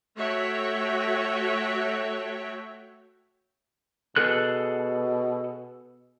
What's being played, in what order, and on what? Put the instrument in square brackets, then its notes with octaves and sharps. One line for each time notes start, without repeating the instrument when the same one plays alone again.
[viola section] A3 F#4 C#5 E5 G5
[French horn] B2 [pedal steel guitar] G#4 A4 F#6